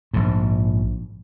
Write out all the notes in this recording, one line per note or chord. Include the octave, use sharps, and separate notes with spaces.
A#1 G#2